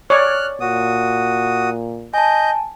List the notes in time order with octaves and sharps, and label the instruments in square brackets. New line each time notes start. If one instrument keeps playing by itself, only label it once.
[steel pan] C#5 D5 [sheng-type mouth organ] F6 F#6
[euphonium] A#2 [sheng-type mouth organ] F#4 D#6
[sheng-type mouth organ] D#5 G6 [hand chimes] G#5 A5